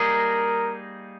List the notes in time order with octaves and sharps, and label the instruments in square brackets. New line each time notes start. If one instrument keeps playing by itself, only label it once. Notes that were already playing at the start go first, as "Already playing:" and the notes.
Already playing: [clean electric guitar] G3 A#3 D#4 G#4 [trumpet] A#4